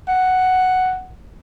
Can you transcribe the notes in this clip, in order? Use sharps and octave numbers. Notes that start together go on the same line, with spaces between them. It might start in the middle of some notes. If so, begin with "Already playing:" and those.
F#5